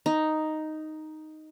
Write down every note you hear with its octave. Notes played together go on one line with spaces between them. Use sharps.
D#4